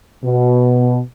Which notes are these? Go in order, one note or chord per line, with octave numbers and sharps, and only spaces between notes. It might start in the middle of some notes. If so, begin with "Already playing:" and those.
B2